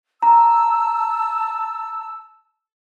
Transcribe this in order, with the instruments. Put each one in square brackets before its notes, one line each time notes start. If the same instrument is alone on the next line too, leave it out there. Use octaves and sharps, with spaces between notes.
[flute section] A5 E6 [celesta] A#5